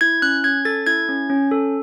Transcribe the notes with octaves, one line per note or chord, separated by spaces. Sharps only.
E4 G#6
C#4 F#6
C#4 G#6
A4 A6
E4 G#6
C#4
C#4
A4